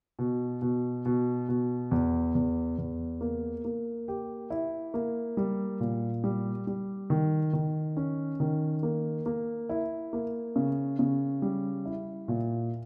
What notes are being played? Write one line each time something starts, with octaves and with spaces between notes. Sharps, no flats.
B2
B2
B2
B2
E2
E2
E2
A#3
A#3
G4
E4
A#3
G3
A#2
G3
G3
D#3
D#3
C#4
D#3
A#3
A#3
E4
A#3
C#3
C#3
G3
E4
A#2